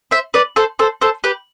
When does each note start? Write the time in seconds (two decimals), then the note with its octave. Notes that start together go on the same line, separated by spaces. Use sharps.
0.11 C5 E5
0.34 B4 D5
0.56 A4 C5
0.79 A4 C5
1.01 A4 C5
1.24 G4 B4